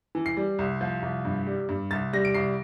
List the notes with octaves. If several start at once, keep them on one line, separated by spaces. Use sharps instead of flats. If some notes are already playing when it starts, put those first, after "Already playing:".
E3
C7
G3
C2
F3
C2
G2
G3
G2
C2 A6
G3 A#6
D7
C2 C7